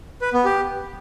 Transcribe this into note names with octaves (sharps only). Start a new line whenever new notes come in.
B4
B3
G4